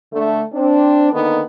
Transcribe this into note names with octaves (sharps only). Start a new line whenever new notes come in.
D3 A3
C4 D4
D3 D#3 A#3 B3 D#4